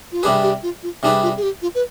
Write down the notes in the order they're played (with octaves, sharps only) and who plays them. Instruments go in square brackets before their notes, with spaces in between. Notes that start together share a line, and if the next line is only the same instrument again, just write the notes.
[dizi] F4
[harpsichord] C3 G3 D4 G#4 B4 [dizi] G4
[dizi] G4
F4
F4
[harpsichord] C3 G3 D4 G#4 B4 [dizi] D#4
[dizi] F4
G#4
G4
F4
B4